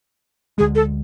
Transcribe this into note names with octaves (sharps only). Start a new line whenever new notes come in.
D2 D3 G#3 G#4
A4